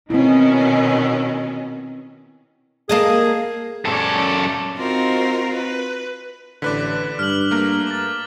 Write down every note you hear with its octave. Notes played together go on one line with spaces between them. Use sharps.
B2 D#3 C4 C#4 E4
A#3 G#4 A4 D#5
F#2 C#4 A4 D5
C4 D#4 F4 F#4 A#4 C5
B4
A1 D3 B4 D5 D6 F#6 B6
G2 F6 F#7
A3 A#3 A#4
D6 A6